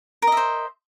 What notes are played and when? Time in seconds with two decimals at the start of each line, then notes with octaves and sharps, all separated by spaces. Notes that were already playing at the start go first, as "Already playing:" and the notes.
0.22 A#4
0.27 D#5
0.32 E5
0.37 C5